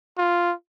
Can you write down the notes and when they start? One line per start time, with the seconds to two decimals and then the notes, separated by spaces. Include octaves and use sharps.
0.18 F4